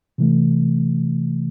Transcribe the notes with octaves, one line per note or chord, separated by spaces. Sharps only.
C3 E3 A3